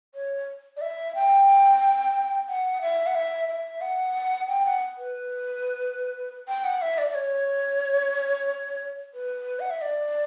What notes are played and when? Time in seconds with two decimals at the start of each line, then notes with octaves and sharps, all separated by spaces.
0.15 C#5
0.77 D5
0.81 E5
1.15 G5
2.49 F#5
2.82 E5
3.07 F#5
3.15 E5
3.49 E5
3.81 F#5
4.48 G5
4.66 F#5
4.98 B4
6.48 G5
6.65 F#5
6.82 E5
6.98 D5
7.10 D5
7.15 C#5
9.14 B4
9.60 F#5
9.70 E5
9.81 D5